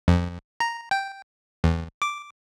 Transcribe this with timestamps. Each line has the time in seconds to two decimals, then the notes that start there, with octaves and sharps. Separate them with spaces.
0.08 F2
0.60 A#5
0.91 G5
1.64 E2
2.02 D6